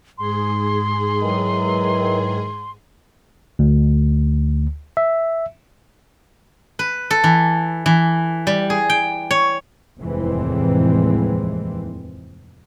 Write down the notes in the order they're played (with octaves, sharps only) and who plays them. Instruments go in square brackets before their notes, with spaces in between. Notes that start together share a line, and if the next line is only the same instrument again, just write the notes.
[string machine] G#2 G#4 [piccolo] C6
[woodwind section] D#3 E3 F#3
[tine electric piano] D2
E5
[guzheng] B4
A4
E3
E3
G3
G#4
G5
C#5
[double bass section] F1 D#2 A2 E3 G#3 C4